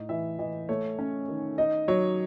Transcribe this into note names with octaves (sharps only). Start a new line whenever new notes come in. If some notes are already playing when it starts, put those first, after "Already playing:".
Already playing: A2 D#4
E3 E5
E3 D#5
A3 C#5
C#4
D#3
D#4 D#5
F#3 C#5